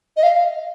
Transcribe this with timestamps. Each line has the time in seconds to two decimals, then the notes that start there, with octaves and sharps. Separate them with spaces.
0.17 D#5
0.23 F5